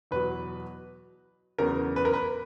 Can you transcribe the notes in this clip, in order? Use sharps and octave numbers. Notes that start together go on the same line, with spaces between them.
E2 B2 F#3 B4
E2 C#3 F#3 A#4
B4
A#4
B4